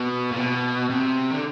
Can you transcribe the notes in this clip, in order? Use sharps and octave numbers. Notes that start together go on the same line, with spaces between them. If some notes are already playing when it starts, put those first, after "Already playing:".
Already playing: B2
A#2
B2
C3
D3